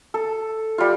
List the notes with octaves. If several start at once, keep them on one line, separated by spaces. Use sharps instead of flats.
A4
G3 F4